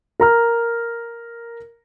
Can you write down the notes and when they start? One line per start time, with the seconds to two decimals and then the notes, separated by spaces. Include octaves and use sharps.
0.20 A#4 A#5 F6